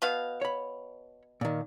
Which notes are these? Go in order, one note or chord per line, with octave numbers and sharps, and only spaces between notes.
B2 B3 F5
C#5 B5
A#2 D#3